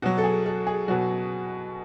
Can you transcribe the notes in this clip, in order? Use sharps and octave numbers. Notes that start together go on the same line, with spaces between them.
B2 F#3 F#4
A4
G#4
A4
G#4
B2 F#3 F#4